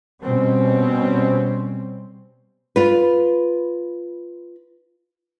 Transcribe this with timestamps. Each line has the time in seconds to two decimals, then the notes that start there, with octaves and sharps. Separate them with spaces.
0.23 B2 G3 C4 C#4
2.76 F4 B4